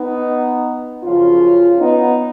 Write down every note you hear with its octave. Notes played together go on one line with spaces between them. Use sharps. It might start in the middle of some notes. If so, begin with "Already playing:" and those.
Already playing: B3 D#4
F#2 C#3 F3 C#4 F4
B3 D#4